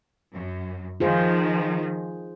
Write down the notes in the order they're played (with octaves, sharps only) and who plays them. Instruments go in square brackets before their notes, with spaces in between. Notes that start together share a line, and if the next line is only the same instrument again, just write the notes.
[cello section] F#2
[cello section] D#3 F3 [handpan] F4 G#4 C5